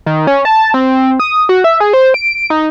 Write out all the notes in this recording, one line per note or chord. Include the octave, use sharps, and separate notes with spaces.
D#3
C#4
A5
C4
D#6
F#4
E5
G#4
C5
D7
D#4